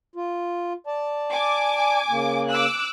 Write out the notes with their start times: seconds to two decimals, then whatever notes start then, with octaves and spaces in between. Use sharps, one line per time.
0.16 F4
0.87 D5 A5
1.32 G#5 D6
2.10 C#3 A#3
2.49 D6 E6 F#6